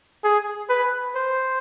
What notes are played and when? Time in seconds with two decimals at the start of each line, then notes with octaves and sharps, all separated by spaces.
0.24 G#4
0.69 B4
1.16 C5